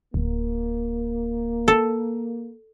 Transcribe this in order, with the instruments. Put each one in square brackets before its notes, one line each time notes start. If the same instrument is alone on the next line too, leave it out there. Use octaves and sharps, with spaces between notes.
[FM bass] D1 [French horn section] A#3
[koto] A4